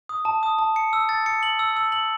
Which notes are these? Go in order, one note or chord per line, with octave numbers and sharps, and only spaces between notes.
D#6
A5
D#6
A5
C#7
E6
A6
C#7
F#7
E6
E6
F#7